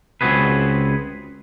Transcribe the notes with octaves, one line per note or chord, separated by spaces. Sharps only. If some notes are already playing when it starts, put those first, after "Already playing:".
C#2 C4 F#4 G#4 B4